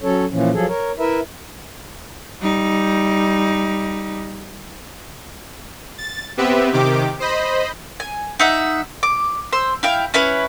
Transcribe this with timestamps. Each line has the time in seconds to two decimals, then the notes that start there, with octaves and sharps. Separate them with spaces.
0.01 F#3 C#4 A4 C#5
0.31 A#2 E3 F3 C#4
0.53 F3 F#3 G#4 A4
0.68 A#4 C#5
0.99 E4 A#4 B4 E5
2.42 G3 D#4
5.98 A6
6.37 B3 C4 G4 B4 E5
6.73 C3 D#3 G4 D6
7.20 C5 D#5 B5
8.00 G#5
8.40 D#4 E5 F#5
9.03 D6
9.53 C5 C6 E6
9.83 E4 F5 G5
10.14 C#4 E4 B4 C#5